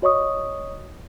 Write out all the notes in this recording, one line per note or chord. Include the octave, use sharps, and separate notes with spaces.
F#4 C#5 D#5 C#6 D#6